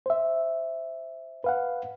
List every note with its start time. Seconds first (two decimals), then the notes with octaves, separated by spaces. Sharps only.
0.06 C5 E5
1.44 B4 F5 F#5